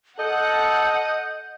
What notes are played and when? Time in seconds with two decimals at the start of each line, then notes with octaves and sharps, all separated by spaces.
0.19 A4 D#5 F#5 G6